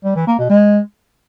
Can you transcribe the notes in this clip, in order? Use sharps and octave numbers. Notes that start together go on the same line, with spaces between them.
G3
E3
A#3
B2
G#3